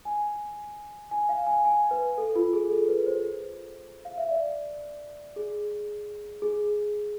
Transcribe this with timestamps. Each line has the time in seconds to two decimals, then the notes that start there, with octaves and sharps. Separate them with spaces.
0.05 G#5
1.11 G#5
1.29 F5
1.47 G#5
1.65 G#5
1.91 B4
2.18 A4
2.36 F4
2.53 G#4
2.70 A4
2.88 B4
3.06 C5
4.05 F5
4.18 E5
4.30 D5
5.36 G#4
6.42 G#4